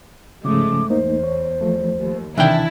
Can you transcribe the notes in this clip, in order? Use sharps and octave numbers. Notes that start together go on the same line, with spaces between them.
G#2 C#3 F3 G#3 A3 C#4 D6
E2 A3 A#3 D#4 C5
C#5
F3 A3
D#2
C3 D#3 E3 D4 E4 E5 G5 A5